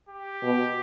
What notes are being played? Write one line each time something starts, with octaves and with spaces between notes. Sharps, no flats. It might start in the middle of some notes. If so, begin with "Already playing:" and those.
G4
B2